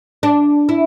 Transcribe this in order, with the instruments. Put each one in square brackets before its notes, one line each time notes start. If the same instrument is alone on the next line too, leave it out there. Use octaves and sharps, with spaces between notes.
[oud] D4
E4